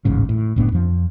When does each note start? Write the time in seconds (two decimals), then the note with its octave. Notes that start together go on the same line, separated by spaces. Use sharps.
0.05 D#1 A1 G#2 C#3
0.29 A2
0.56 F#1 A2 B3 D4
0.72 F2 F3